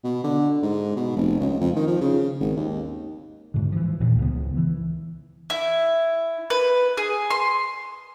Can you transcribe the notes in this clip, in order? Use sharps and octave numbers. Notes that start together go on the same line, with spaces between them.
B2
D3
G#2
B2
F1
C#2
F2
D#3
F3
C#3
G#1
D#2
G#2 D3
E3 F3
D#1 G2 A#2
C#2 B3
E3
E4
B4
G#4
C6